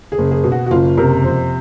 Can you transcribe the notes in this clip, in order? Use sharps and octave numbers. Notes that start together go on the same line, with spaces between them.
G#4
F#1
G#4
B2
F#4
F#4
F#1 F4
C3 A#4
F2 C5